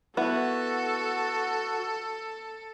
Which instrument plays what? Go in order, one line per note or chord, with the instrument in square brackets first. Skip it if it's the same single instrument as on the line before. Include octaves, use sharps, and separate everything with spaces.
[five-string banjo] B3 E4 [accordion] F#4 [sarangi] A4